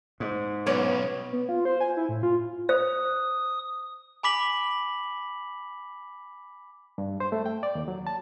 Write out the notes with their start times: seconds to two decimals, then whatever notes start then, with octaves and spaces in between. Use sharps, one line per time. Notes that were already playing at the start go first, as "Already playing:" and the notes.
0.20 G#2
0.67 B1 B3 C#4 D5
1.33 B3
1.49 F4
1.65 C5
1.81 G#5
1.97 E4
2.09 A2
2.23 F4
2.69 C5 D#6
4.23 G#5 B5 D6 B6 F#7
6.98 G2
7.20 C5
7.32 A3
7.46 G5
7.63 D5
7.75 D#2
7.88 F#3
8.07 A5